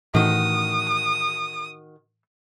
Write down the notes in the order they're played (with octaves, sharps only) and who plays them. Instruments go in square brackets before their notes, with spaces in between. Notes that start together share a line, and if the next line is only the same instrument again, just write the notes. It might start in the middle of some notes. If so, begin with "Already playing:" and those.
[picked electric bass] A2 E3 A3 [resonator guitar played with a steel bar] D#3 F#4 [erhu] D#6